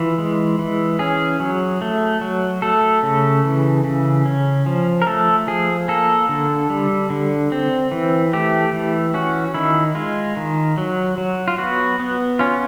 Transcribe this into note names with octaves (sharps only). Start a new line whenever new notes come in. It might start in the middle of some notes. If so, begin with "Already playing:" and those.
Already playing: E3 F4
G#3
E3
C#4 G#4
F#3
A3
F#3
A3 A4
C#3
E3
C#3
C#4
F3
A#4
A3 A4
F3 G#4
A#3 A4
D3
G3
D3
C4
E3
A3 G4
E3
C#4 F#4
D#3 E4
G#3 F4
D#3
F#3
F#3
F4
B3 F#4
B3
C#4 F4